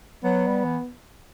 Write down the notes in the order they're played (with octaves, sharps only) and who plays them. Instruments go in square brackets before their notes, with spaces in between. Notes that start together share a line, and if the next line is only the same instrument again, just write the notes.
[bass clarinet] F#3 [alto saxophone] B3
[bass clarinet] G3
E3